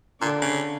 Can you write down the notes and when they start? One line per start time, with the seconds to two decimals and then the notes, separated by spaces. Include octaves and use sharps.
0.21 A#2 D3 D4
0.41 C#3